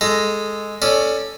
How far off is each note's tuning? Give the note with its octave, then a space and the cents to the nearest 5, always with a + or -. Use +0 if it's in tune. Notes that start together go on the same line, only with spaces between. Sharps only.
G#3 +0 A4 +0 A#5 -35
C#4 +0 A4 +0 D5 +20